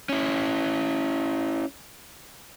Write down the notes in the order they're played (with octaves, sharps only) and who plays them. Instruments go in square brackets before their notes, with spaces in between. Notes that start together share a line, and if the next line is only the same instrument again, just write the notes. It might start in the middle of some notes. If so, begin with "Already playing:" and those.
[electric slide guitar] C#4 E4